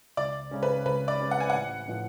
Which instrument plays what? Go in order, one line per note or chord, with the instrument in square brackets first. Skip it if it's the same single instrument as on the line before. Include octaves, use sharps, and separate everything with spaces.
[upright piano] C#2 [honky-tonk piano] D5
[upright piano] C#3 G#3 C#4
[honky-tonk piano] B4
[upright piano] C#2 [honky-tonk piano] B4
[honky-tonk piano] D5
[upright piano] C#3 G#3 C#4
[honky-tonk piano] F#5
G#5
[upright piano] A1 [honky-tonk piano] F#5
[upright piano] A2 F3 B3 F4